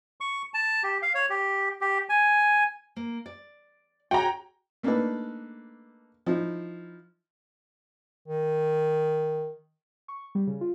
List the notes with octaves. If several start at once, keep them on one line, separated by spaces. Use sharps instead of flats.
C#6
A5
G4
F5
C#5
G4
G4
G#5
A#3
D5
F#4 G#4 C#5 G5 A#5
A3 A#3 D4 D#4 A4 B4
F3 D#4 E4
D#3
C#6
G3
C#3
F4